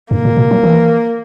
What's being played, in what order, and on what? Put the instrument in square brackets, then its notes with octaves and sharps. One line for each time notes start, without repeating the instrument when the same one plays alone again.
[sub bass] G2 [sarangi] A#3
[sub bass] A#2
B2
F#3
E3